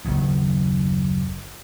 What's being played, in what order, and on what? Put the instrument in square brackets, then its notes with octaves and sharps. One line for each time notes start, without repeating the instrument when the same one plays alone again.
[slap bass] F#1 D#2